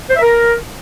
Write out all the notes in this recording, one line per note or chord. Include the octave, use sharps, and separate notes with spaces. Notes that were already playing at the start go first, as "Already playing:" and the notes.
C5
E5
A#4